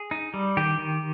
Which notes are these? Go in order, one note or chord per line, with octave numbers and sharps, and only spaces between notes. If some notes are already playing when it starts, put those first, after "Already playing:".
Already playing: G#4
D#4
G3
D#3 G4
D#3